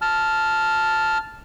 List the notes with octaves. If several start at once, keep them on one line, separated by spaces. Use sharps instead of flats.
A5 F6